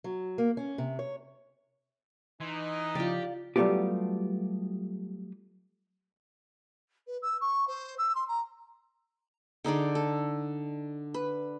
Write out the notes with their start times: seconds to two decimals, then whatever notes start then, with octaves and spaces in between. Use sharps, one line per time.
0.04 F#3
0.38 A#3
0.57 C#4
0.78 C3
0.99 C#5
2.40 E3 D#4 C6 G#6
2.95 C#3 F3 E4 F4 G4 D5
3.56 F#3 G3 A3 B3 F4 G4
7.07 B4
7.22 E6
7.40 C#6
7.67 C5
7.98 E6
8.15 C6
8.28 A#5
9.64 D3 D#4 G#4 D5
9.95 A4
11.14 B4